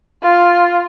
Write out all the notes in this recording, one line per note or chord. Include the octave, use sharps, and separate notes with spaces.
F4